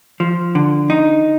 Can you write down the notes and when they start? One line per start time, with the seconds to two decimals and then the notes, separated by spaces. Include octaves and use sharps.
0.20 F3
0.55 D3
0.90 D#4